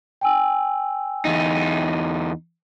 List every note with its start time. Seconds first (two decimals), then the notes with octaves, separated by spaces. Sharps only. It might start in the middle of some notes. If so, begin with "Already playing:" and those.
0.21 G5 G#5 E6
1.25 E2 D#4